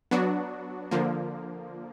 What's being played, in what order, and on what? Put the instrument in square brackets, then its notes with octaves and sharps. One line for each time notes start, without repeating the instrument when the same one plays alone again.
[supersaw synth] F#3 B3 D4 F#4
D3 F3 A#3